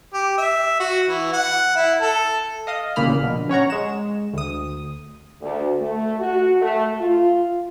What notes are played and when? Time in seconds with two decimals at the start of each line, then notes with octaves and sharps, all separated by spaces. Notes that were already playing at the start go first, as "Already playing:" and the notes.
0.13 G4
0.38 E5
0.80 F#4
1.08 E3
1.33 F#5
1.76 E4
2.01 A4
2.67 D#5 F5 D#6
2.96 A1 A#2 C#3 A#3 B5 F6
3.23 A#1 B2
3.49 C#4 C#5 F#5 A#5
3.70 G#3 E7
4.34 D2 D#6
5.40 D2
5.80 A3
6.19 F#4
6.61 A3
6.99 F4